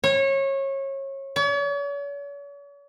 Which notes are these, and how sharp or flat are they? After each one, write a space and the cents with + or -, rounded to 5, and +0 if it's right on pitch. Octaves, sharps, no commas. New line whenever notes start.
C#5 -25
C#5 +45